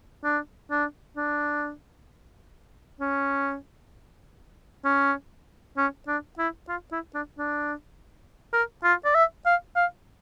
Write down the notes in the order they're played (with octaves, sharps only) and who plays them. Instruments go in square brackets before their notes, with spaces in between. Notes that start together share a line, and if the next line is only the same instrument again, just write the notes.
[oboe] D4
D4
D4
C#4
C#4
C#4
D4
E4
F4
E4
D4
D4
A#4
F4
D5
E5
F5
F5